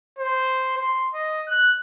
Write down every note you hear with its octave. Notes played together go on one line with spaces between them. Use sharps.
C5
C6
D#5
F#6